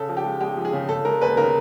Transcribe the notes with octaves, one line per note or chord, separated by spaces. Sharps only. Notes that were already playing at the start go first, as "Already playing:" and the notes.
Already playing: C#3 A4
F3
G4
G#3
G#3 G4
F3
G#4
C#3
C#3 A4
G#3 A#4
D#2 B4
C#3 A#4